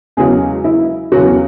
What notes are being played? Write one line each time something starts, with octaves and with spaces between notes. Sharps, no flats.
E2 C#3 F#3 G#3 G#4
E4
E2 C#3 F#3 F#4